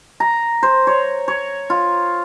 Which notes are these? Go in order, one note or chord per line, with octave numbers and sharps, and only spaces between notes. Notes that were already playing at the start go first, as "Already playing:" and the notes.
A#5
C5
C#5
C#5
F4